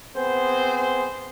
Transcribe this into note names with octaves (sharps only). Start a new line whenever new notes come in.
B3 C4 G#4 C5